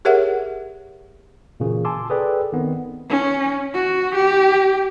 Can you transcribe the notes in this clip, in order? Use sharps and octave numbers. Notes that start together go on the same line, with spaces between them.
G4 G#4 A#4 C#5 E5 F#5
A#2 C#3 E3 A#3 F#4
G#5 A5 C6 D6 E6
G#4 A4 B4 D5 G5
D#3 B3 C4
C#4
F#4
G4